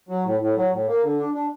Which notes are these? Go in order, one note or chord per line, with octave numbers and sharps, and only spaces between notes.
F#3
A2
A2
F#3
A2
A#3
D3
D4
D4